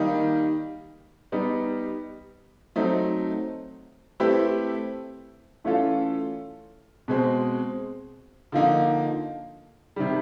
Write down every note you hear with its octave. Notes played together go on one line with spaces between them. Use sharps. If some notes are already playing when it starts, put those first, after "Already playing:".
Already playing: D#3 G3 A#3 D#4
G3 B3 D#4
F#3 A3 C4 D#4
A3 C4 E4 G4 B4
E3 A3 C#4 F4 A4
B2 G#3 C4
D3 F3 A#3 D#4
C3 D#3 G3